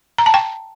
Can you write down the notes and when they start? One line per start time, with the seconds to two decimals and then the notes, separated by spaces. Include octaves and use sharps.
0.18 A#5
0.26 A5
0.34 G5